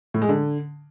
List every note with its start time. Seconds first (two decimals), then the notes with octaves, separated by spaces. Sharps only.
0.14 A2
0.22 G#3
0.29 D3